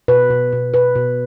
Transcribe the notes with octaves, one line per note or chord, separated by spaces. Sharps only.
B2 B4
B2
B2
B2 B4
B2